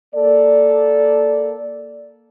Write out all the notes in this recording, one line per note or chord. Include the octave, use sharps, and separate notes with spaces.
A#3 A4 D5